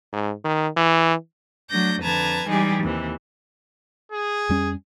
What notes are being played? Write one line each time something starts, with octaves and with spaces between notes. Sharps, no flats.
G#2
D#3
E3
F#3 A3 D4 G6 A#6
F2 D3 B4 A5 A#5 G#6
E3 G3 G#3 D#4 G4 G#4
D#2 C3 E3
G#4
F2 G3 C#4